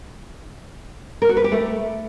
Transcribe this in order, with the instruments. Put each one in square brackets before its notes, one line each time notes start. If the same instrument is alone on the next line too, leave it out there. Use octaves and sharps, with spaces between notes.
[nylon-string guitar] A#4
F#4
B4
G4
A3